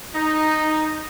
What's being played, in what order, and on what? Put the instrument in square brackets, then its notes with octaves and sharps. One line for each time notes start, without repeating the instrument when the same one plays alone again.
[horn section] D#4